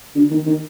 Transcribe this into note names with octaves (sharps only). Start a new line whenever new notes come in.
D3
D#3
D#3